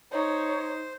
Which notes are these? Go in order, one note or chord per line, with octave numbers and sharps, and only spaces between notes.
D#4 C5 C#5